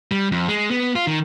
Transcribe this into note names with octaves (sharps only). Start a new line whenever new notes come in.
G3
F2
G#3
B3
F4
D#3